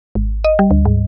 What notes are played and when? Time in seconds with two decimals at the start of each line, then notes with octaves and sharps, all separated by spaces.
0.15 G#1
0.44 D#5
0.59 G3
0.71 D2
0.85 G#2